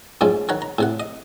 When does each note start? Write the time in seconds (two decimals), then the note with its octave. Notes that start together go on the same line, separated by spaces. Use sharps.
0.21 F2 G#2 A3 C4 C#4
0.49 D#3 C#5 F#5 A#5
0.62 A#5
0.78 A2 C3 F#5
1.00 D#5